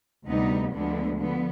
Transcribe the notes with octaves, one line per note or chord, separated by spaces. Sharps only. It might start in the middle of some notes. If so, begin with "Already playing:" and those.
D2 C3 G3 B3 D#4
D2 D3 F3 G#3 B3
D3 F3 B3